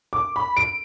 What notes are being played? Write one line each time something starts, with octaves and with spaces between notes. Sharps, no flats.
D6
B5
D7